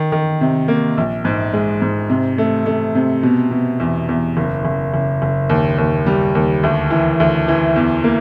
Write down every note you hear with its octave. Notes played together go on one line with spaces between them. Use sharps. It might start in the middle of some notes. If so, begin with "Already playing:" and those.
Already playing: D#3
D#3
C3
A#3
A#1
G#2
G#3
G#2
C3
A3
A3
C3
B2
B2
E2
E2
F#1
F#1
F#1
F#1
D#2
D#2
G3
D#2
D2
E3
D2
E3
E2
A#3